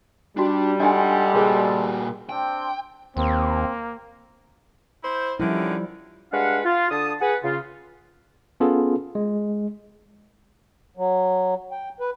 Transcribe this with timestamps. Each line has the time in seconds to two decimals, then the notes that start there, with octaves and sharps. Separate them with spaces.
0.37 G3 D4 D#4 F#4
0.80 G#3 D4 D#4 F4 A4 E5 F#5 G#5
1.35 A#2 F#4 G#4 A#4 C5
2.29 C4 D4 G5 C6
3.17 D#2 A#3 C4
5.04 E4 C5
5.40 D3 D#3 F3 G3 C#4 E4
6.33 G3 G#3 D4 B4 F5 F#5
6.64 F4
6.91 D3 A5 D#6
7.21 G#4 B4 F#5
7.44 C#3 F4
8.60 B3 C#4 F4 G#4 A4
9.15 G#3
10.97 F#3
11.71 G5
12.00 B4